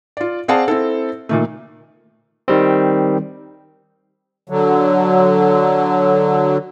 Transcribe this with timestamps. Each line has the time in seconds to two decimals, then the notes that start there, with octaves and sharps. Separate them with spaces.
0.17 F4 D5
0.48 C4 G#4 D5 F5 F#5 A5
0.68 C4 E4 A4
1.29 A#2 D#3 A3
2.48 D#3 G3 C4
4.49 D3 F#3